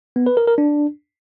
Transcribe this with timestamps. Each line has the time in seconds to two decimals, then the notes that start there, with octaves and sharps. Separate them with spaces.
0.16 B3
0.26 B4
0.37 A#4
0.47 A#4
0.58 D4